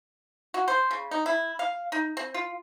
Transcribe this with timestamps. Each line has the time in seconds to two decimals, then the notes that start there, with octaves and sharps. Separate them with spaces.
0.54 F#4
0.68 C5
0.91 C#3
1.11 D#4
1.26 E4
1.59 F5
1.92 D#4
2.17 C4
2.34 F4